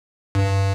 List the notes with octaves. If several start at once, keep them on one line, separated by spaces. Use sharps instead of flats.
G2